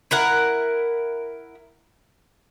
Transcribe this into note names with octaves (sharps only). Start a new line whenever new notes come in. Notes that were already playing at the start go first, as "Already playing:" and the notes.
E4 A#4 F#5